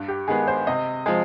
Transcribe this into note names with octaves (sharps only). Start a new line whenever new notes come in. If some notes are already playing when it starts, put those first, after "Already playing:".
Already playing: G2
G4
D#3 G#3 B3 G#4
C5
C3 D#5
F3 G#3